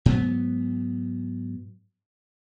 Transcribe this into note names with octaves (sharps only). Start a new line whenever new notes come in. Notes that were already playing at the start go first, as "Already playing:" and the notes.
G#2 F#3 B3